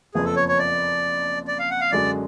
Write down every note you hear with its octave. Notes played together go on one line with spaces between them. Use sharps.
F#1 F2 F3 B3 G#4
A4
C#5
C#5
D5
D5
F5
F#5
F5
F#2 D3 G#3 D4 F#4 D5